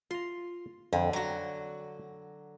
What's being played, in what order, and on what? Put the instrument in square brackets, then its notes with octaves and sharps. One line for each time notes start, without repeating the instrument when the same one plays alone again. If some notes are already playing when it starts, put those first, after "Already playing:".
[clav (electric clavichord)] F4 A#5 [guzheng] C6
[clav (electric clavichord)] F2 [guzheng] D3
[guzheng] F#3 F#4 [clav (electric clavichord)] A#5